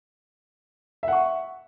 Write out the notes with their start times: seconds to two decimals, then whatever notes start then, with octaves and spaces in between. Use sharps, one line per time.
1.03 E5
1.08 F#5
1.13 C#6